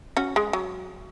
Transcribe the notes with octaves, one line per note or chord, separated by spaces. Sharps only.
C#4 F#4
G#3
F#3